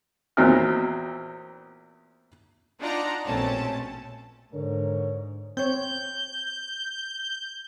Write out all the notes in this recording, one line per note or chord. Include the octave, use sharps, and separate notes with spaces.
E2 A#2 F#3 C4 D#4 F6
D4 D#4 F4 D5 F#5 A#5
A#1 B2 A3 C4 C#4 A5
G#2 D3 A#4 C#5
C4 C#5 G6